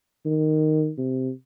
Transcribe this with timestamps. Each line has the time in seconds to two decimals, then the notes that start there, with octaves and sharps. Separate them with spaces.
0.25 D#3
0.98 C3